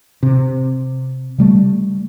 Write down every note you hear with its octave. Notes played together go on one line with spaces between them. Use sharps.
C3
C#3 G3 A3